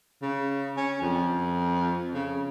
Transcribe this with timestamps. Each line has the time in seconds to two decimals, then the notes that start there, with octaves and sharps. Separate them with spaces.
0.22 C#3
0.77 C#4
1.01 F2
2.14 C#3